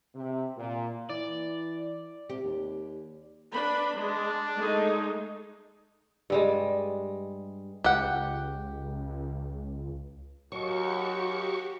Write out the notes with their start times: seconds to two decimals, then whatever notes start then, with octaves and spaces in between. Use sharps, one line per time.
0.15 C3
0.57 A#2
1.09 E3 D5
2.30 C3 G4
2.44 D#2
3.54 D4 B4 B5
3.97 G#3 D4
4.57 G#3 A3 D#4
6.30 G2 G3 G#3
7.84 C#2 G4 F#5
10.52 D#2 F#3 F#4 G4 C#6